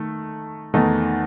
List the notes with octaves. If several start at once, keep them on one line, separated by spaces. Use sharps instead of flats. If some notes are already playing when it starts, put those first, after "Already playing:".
Already playing: D#3 A3
E2 D#3 A3 D#4